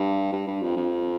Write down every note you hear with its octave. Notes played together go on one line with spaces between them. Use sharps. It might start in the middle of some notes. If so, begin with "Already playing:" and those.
Already playing: G2
G2
G2
F2
F2